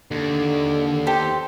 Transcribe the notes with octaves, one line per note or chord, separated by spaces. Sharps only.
D#2 D3
G4 A4 C5